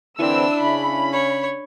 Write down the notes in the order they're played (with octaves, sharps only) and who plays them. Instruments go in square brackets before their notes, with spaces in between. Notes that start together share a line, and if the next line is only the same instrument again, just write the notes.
[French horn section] D3 E3 C4 [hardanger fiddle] D4 [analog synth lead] E4 [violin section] E6
[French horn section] C#3 C#4 [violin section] B5
[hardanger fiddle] C#5